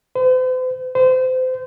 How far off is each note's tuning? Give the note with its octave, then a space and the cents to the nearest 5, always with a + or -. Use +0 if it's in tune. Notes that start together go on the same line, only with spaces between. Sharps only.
C5 -45
C5 -30